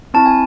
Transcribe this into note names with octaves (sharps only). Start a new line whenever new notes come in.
C4 E4 A5
G#5